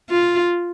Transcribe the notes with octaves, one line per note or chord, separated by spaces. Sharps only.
F4